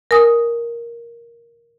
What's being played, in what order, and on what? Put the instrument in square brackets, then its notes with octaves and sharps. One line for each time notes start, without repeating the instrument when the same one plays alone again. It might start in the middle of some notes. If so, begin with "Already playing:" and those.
[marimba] A#4 G#5 D#6